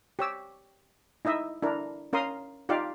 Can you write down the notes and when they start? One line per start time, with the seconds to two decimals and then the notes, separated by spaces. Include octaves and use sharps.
0.19 G4 C#5 E6
1.25 D#4 E4 D#5 E5
1.62 D4 E4 A#4
2.13 C#4 A#4 F5 C6 D#6
2.69 D#4 F4 G4 D5 F5